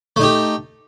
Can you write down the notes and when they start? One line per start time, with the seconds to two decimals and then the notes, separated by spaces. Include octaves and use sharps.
0.16 A3
0.20 D#4
0.23 G4